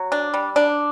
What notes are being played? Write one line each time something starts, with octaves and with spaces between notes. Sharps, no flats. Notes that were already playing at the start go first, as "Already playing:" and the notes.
Already playing: F#3
D4
G3
D4